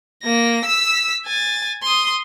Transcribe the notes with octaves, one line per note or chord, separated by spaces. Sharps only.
A#3 A#6
E6 B6
G#5 A6
C6 D#6